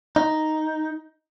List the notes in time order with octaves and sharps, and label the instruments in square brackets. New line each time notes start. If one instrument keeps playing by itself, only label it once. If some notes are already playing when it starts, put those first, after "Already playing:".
[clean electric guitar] D#4